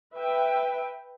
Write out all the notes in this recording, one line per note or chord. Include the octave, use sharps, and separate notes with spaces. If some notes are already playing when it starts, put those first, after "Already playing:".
B4 E5 G5